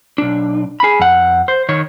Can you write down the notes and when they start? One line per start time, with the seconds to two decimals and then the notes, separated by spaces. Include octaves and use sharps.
0.18 B1 D4
0.80 G#4 B5
1.00 F2 F#5
1.48 C5
1.69 D#3 C#5